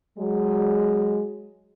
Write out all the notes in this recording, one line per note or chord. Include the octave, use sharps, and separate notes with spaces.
F#3 G#3